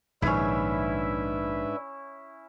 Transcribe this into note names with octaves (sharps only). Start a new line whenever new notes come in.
A#1 G#2 D#3 C#4 D4 E4 B4 E5